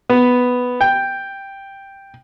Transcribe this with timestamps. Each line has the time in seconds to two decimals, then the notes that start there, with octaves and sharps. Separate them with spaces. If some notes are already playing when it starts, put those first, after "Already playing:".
0.10 B3
0.81 G5